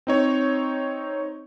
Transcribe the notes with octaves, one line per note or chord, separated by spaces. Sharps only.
C4 D#4 C#5